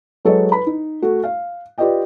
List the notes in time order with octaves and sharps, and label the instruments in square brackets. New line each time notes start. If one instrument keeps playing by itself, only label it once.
[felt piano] F#3 G#3 A4 B4 C#5 D#5
B4 B5
D#4
A3 F#4
F5
F4 G4 B4 D5 D#5 G5